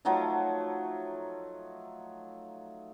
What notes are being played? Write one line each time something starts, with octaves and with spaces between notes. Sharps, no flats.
F3 F#3 A3 D#4